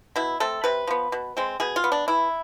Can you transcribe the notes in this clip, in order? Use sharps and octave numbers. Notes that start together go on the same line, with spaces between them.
B2 E4
A3 C4 A4
C3 B4
F3 B3
B2
G#3 C4
B2 G#4
F4
B3
D4
E3 E4